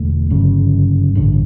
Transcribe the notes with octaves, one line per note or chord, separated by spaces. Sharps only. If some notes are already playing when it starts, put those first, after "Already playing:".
Already playing: E1 E2 D3 A3
G1 F#2 C#3
A1 G2 D3